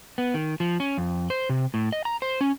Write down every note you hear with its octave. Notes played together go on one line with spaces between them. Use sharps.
B3
D#3
F3
C#4
F2
C5
C3
A2
D#5
A#5
C5
C#4